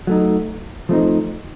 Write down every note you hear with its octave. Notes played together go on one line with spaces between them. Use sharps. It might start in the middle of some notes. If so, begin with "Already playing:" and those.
F#3 A3 D#4
F3 A3 C4 D#4